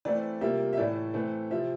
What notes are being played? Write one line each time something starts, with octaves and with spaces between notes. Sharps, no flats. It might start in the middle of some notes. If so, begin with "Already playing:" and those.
E3 A3 C4 E4 D5
C3 G3 A#3 F4 E5
E5
A2 E3 A3 E4 D5
E3 A3 C4
C3 F3 C4 F4 E5